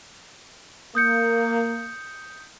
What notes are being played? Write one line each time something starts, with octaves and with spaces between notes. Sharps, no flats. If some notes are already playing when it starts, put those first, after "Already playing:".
A#3 D#6 G6 C#7